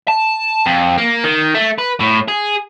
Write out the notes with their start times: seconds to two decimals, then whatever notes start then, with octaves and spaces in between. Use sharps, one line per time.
0.08 A5
0.66 F2
0.98 A#3
1.24 D#3
1.54 A3
1.78 B4
2.00 A2
2.28 G#4